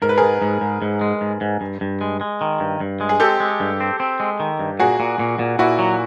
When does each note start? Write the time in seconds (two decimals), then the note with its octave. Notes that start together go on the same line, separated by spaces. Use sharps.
0.02 G#2 A#4
0.09 B4
0.17 G#2 G#4 A#4
0.42 G#2
0.61 G#2
0.82 G#2
1.01 G#3
1.21 G#2
1.41 G#2
1.61 G2
1.81 G2
2.01 G#3
2.21 G#3
2.41 D#3
2.60 G2
2.80 G2
3.01 G#3
3.09 G#4
3.20 C4 G4 A4
3.40 G#3
3.60 G2
3.80 C4
4.00 C4
4.20 G#3
4.40 D#3
4.60 G2
4.80 A#2 F#4 G#4
5.00 A#2
5.19 A#2
5.39 A#2
5.59 A#2 E4 F#4
5.79 F#3